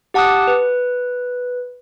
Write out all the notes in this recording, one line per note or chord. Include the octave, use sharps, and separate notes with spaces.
G4 F#5 A5 D6 D#6 F#6
B4